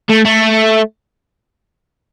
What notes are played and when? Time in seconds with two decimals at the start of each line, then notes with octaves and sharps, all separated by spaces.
0.09 A3
0.25 A3